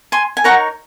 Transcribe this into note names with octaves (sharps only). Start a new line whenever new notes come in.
G#5 C6
G#5
D#4 A#4 C#5 F#5 A#5